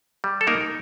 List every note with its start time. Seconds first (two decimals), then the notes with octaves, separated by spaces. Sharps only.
0.24 G3
0.41 A4
0.47 A#3 D#4 A#4